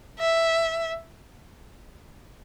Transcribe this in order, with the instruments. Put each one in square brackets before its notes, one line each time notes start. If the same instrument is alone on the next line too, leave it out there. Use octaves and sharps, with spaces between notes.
[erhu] E5